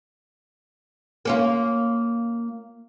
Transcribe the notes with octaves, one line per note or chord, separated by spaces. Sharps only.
A#3 C#4 F4